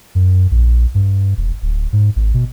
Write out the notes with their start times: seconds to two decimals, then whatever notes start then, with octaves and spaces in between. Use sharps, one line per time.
0.15 F#2
0.51 A#1
0.94 G2
1.37 E1
1.62 D1
1.93 G#2
2.16 G#1
2.34 B2